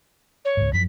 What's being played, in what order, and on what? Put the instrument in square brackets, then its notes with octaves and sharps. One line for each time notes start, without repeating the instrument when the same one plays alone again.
[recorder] C#5
[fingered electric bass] C#2 G#2
[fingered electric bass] F#2 F3 [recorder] B6